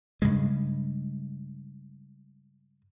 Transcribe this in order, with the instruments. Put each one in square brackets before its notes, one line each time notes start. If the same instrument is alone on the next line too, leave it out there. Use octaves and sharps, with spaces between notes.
[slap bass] G2 C#3 G#3